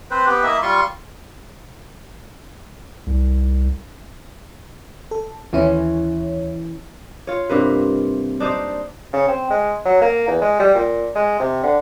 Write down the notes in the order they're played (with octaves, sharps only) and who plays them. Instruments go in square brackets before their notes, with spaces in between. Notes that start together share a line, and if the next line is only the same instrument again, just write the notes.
[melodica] C4 B4 C5
B3 G4 B4
A#3 E4 D#5 E5
G3 F4 C6 C#6
[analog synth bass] C2
[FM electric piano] A4
[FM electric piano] D#2 E4 C#5 [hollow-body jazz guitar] E3 C#4
[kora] F4 C#5
G2 C3 A#3 B4
D4 D#4 C5 D5
[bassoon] C#3
C4
G#3
F#3
A#3
E2
G#3
G3
A#2
G#3
C3
D3